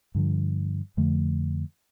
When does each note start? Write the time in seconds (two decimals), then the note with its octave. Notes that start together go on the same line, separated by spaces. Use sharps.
0.15 G2 D3 F3
0.97 F2 D3 F3 A3